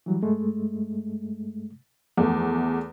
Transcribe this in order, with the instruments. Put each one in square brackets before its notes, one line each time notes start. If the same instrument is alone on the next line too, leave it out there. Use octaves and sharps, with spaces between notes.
[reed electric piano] E3 F#3 G3
G2 G#3 A3
[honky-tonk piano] E2 A3 [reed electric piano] F3